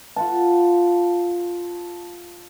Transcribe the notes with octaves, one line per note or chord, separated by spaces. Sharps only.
F4 F#5 A5